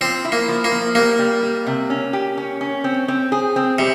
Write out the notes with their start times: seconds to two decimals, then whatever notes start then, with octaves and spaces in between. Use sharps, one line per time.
0.01 F3 C4
0.25 E4
0.32 A#3
0.48 F3
0.64 A#3
0.72 F3
0.95 G3 A#3
1.19 G3
1.43 G3
1.67 C3
1.90 C#4
2.13 G4
2.37 C#4
2.61 C#4
2.84 C4
3.08 C4
3.32 G#4
3.56 C4
3.79 C3 G3